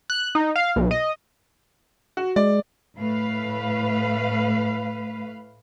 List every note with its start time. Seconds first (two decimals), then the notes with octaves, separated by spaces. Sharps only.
0.10 F#6
0.35 D#4
0.56 F5
0.76 B1
0.91 D#5
2.17 F#4
2.36 G#3 D5
2.97 A2 A3 B4 F5